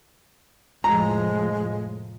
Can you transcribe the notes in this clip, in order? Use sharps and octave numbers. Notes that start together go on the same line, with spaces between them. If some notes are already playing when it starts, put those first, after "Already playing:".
F1 A2 F3 G#3 A#5